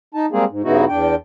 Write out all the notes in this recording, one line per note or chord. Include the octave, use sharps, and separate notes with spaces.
D#4 A5
G3 G#3 A#3 C4 G#4
G#2
G2 C#3 B3 D#4 E4 F#4
E2 D4 G5